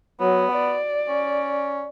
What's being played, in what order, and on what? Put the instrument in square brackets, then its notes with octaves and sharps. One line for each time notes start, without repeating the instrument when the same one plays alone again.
[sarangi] F#3 [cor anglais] B3
[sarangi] D5
[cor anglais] C#4